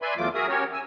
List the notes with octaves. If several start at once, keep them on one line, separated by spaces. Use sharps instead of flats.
B4 D5 E5 G#5 B5 C6
E2 E3 F#3 A3 F4 D6
F#4 G#4 A#4 E5 D#6
C#4 F#4 G4 A#4 C#5
G#5 E6